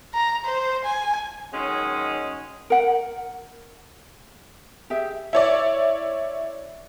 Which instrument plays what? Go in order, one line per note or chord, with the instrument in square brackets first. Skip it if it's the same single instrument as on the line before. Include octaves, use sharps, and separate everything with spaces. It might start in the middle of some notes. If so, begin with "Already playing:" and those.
[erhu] A#5
C5
G#5
[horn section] D#3 F#3 G#3 C#4
[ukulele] A#4 F#5
G4 G#4 E5
[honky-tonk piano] E4 C#5 D5